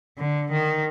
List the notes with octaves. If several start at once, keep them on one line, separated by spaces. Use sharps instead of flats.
D3
D#3